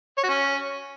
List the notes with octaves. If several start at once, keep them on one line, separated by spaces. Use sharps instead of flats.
C#5
F#4
C#4